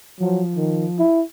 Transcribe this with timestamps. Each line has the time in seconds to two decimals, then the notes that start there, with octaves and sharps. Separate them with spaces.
0.20 F3 F#3
0.56 D#3
0.99 E4